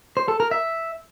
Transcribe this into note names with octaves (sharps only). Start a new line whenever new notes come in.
C5
A4
A#4
E5